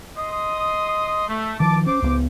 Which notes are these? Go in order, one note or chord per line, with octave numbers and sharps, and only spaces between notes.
D#5 C6 D#6
A3
D#3 F3 A5 D6
C#4 C5 D6
C#2 F#3 B3